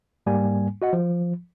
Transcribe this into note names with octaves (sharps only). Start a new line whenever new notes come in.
G#2 G3 A#3 G#5
F#4 D#5 F#5
F3